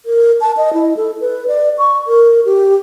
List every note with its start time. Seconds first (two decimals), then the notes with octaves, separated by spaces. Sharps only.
0.06 A#4
0.41 A5
0.57 D#5
0.74 E4
0.97 A4
1.21 B4
1.48 D5
1.78 C#6
2.07 A#4
2.45 G4